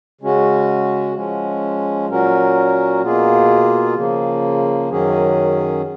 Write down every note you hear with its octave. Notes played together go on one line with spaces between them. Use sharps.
C#3 G#3 C#4 F#4
F3 G#3 C#4
A#2 F#3 C#4 F#4 A#4
B2 A#3 F4 G#4
C#3 F3 A#3
F#2 D#3 F#3 C#4 G#4